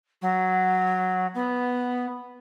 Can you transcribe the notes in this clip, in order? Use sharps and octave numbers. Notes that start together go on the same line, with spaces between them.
F#3
B3